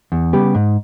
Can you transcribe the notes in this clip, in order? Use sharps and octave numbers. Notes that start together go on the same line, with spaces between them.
E2
C#3 G3 B3 G4
G#2